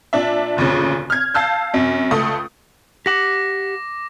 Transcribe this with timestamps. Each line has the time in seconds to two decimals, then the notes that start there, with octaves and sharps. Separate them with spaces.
0.13 A#2 D4 E5
0.57 F1 D2 A#2 C#3
1.10 F6 G#6
1.34 F5 A5 E6 G6
1.74 F#2 C3
2.11 C#2 A3 D#6
3.06 G4 F#5 D6 A#6